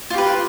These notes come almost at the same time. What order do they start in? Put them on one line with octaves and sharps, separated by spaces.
F4 G4 B4